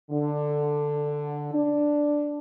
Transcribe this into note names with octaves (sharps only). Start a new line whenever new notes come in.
D3
D4